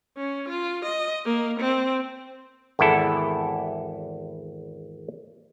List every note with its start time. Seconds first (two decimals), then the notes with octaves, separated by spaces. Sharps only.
0.17 C#4
0.49 F4
0.85 D#5
1.25 A#3
1.60 C4
2.79 G#1 E2 B3 E4 A4